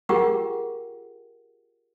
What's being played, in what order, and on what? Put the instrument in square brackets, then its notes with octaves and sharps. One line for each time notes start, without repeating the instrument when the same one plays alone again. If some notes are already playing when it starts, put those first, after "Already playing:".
[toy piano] F4 G4 G#4 A#4 F#5 G5